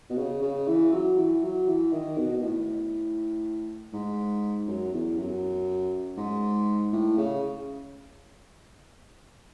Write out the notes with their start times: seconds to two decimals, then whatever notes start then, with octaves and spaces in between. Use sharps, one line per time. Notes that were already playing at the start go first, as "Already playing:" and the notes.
0.10 B2
0.18 C#3
0.42 C#3
0.67 E3
0.93 F#3
1.18 E3
1.43 F#3
1.68 E3
1.92 D#3
2.17 B2
2.37 B2
2.42 A2
3.93 G#2
4.68 F#2
4.92 E2
5.18 F#2
6.17 G#2
6.93 A2
7.17 C#3